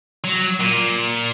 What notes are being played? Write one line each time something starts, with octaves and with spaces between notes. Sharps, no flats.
F#3
A#2